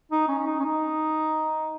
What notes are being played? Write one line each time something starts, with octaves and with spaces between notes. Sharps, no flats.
D#4
C#4
C#4
D#4
C#4
D#4